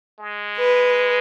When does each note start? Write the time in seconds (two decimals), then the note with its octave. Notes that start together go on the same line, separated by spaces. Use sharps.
0.19 G#3
0.58 B4